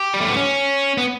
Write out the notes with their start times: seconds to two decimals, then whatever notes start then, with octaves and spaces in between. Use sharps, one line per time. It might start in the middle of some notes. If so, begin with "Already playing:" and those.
Already playing: G4
0.14 G3
0.21 A3
0.29 B3
0.36 C#4
0.98 B3